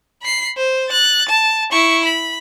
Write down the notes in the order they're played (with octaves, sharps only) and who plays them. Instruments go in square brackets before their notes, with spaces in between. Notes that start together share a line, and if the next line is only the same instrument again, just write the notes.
[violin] B5 C7
C5
F#6 A6
A5
E4 C#6
B5